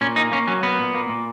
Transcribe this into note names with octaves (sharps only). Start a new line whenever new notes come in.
A#2 C#4
A#3 D#4
A#3 C#4
F#3 C#4
A#3 B3
A#2
A#3
A#2